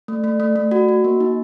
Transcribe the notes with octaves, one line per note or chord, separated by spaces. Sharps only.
A3
A3
A3
A3
F#4
F#4
A#3
D#4